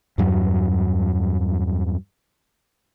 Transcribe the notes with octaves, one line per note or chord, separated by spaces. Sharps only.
E2 G2 F#3